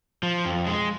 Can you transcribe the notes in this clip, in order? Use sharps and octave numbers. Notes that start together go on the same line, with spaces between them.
F3
F2
G#3